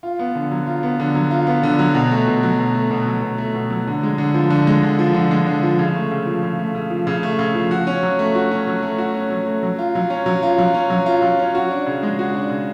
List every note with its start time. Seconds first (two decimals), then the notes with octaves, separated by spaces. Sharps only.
0.03 F4
0.19 B3
0.35 D3
0.51 F#3
0.66 F4
0.83 B3
1.00 D3
1.15 F#3
1.31 F4
1.47 B3
1.63 D3
1.79 F#3
1.95 B2
2.11 A3
2.28 B2
2.43 F#3
2.59 B2
2.75 A3
2.91 B2
3.07 F#3
3.23 B2
3.38 A3
3.55 B2
3.70 F#3
3.87 D3
4.03 G#3
4.18 D3
4.34 F3
4.50 D3
4.67 G#3
4.83 D3
4.99 F3
5.14 D3
5.31 G#3
5.47 D3
5.63 F3
5.79 C#3
5.95 A3
6.11 C#3
6.26 F3
6.43 C#3
6.59 A3
6.75 C#3
6.90 F3
7.07 C#3
7.23 A3
7.39 C#3
7.55 F3
7.71 F#4
7.87 C#4
8.03 F#3
8.19 A3
8.35 F#4
8.51 C#4
8.67 F#3
8.82 A3
8.98 F#4
9.14 C#4
9.30 F#3
9.47 A3
9.63 F#3
9.79 F4
9.95 F#3
10.10 C#4
10.26 F#3
10.43 F4
10.58 F#3
10.74 C#4
10.90 F#3
11.06 F4
11.22 F#3
11.39 C#4
11.55 F#4
11.71 D4
11.86 C#3
12.03 G#3
12.19 F#4
12.34 D4
12.50 C#3